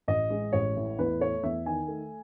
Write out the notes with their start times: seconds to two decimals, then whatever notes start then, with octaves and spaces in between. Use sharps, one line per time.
0.08 A1 D#5
0.30 G#3
0.53 A1 C#5
0.76 A2
0.98 E2 B4
1.20 A3 C#5
1.43 E2 E5
1.66 D#3 G#5
1.88 A3